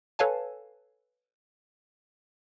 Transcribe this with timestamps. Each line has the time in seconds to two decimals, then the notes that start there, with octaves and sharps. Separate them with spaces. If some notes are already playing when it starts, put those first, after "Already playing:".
0.19 A4 B4 C#5 F5 G#5 A5